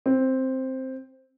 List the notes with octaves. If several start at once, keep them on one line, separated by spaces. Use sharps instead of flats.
C4